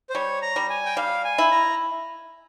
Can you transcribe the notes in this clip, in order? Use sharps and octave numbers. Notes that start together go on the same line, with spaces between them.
C5
G3 C#5
A#5
G3
G#5
G5
G3 F5
G#5
E4
A#5